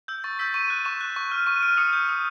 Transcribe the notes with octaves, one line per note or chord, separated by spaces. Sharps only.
E6 G6
C#6 A6
E6 G6 B6
C#6 D#7
F#6
C#6 E7
F#6
C#6
F6
C#6 D#7
F6 D7
D#6 C#7
G6
D#6